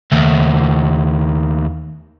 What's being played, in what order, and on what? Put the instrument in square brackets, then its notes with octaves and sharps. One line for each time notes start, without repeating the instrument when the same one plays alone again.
[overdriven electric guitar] D#2 A3